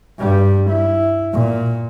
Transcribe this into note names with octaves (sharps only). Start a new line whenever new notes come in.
G2 G3
E4
A#2